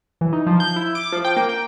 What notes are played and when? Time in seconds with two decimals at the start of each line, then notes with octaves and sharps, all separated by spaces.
0.21 E3
0.33 D#4
0.47 F3
0.60 G6
0.76 E4
0.95 D6
1.12 F3
1.25 G5
1.37 A#3
1.49 G5